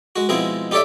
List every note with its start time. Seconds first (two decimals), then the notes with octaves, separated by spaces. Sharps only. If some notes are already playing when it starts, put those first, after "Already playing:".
0.16 G#3 F#4
0.29 B2 F3 G#3 C4 E4 G#4
0.71 D#4 G4 A4 C#5 D5 E5